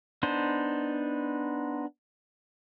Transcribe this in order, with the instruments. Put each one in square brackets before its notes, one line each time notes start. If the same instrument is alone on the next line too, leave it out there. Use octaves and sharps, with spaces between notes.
[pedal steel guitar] B3 D4 D#4 C5